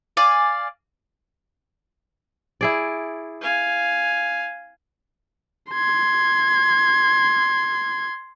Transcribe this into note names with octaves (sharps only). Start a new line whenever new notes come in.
D5 F5 G#5
E4 G#4 D5
F5 G#5
C6 G#6